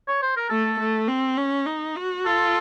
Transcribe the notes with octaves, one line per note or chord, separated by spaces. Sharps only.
C#5
C5
A#4
A3 A4
A3
C4
C#4
D#4
F#4
F4 A4